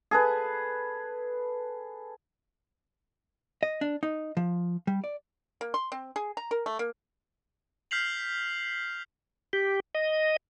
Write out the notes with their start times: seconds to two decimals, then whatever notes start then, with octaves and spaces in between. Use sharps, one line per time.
0.11 G#4 A4 B4
3.63 D#5
3.81 D4
4.03 D#4
4.37 F3
4.87 G3
5.04 D5
5.61 A#3
5.74 C6
5.92 C4
6.16 G#4
6.37 A#5
6.51 A#4
6.66 A3
6.79 A#3
7.91 F6 G6 B6 C7 F7 F#7
9.53 G4
9.95 D#5